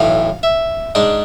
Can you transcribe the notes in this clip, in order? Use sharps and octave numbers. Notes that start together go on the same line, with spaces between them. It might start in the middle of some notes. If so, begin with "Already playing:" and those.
Already playing: B1 A2 E3 F5
E5
G#2 G#3 D4 D5